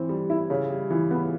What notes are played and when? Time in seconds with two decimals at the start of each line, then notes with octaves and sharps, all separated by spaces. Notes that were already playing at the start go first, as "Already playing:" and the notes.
Already playing: E3 C4
0.09 G3
0.30 E4
0.50 C#3
0.70 G3
0.90 E3
1.11 B3